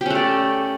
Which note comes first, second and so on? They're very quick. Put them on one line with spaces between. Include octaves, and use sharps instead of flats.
G4 C#4 A3 D5